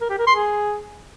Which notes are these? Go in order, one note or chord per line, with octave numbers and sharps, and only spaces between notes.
A#4
G4
A#4
C6
G#4